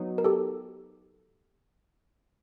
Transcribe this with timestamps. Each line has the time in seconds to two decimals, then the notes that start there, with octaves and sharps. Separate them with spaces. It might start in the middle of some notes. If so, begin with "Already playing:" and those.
Already playing: F#3 B3 D#4
0.18 A#4
0.24 G4 A4